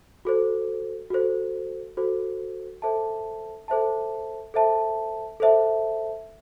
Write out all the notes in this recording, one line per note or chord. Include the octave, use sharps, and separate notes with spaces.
F#4 A4 C5
F#4 A4 C5
F#4 A4 C5
A4 C5 E5 A5
A4 C5 E5 A5
A4 C5 E5 A5
A4 C5 E5 A5